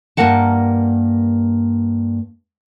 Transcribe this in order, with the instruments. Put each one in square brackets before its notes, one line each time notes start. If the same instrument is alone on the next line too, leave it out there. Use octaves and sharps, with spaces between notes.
[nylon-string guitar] G2 F3 A#3 A#4 F#5 A5